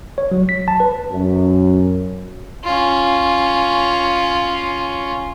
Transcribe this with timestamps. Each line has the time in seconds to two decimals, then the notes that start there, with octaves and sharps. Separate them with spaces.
0.18 C#5
0.31 F#3
0.49 B6
0.68 A5
0.80 B4
1.12 F#2
2.64 C#4 F4